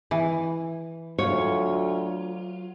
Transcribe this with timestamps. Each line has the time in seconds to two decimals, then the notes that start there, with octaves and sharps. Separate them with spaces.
0.11 E3
1.18 D2 F#3 F4 C#5